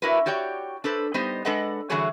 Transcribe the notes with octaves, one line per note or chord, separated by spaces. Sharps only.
D4 E4 F#4 A#4 B4
F#4 G4 C#5 D5 G5
D4 A4 B4 C5
G3 B3 D#4 G4 C5 D#5
G#3 D4 A4 B4 D#5 F#5
D3 E3 G3 F#4 G#4 C#5